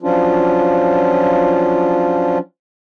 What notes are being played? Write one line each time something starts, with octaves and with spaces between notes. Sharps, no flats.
F3 F#3 C#4 D4 F4